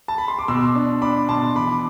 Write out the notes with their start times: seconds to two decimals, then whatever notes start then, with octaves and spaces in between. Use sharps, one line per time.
0.08 A5
0.18 B5
0.28 C6
0.39 D6
0.48 B2 C6 E6
0.75 D4
1.02 D4 B5 D6
1.29 B2 A5 C6
1.56 E3 B5 D6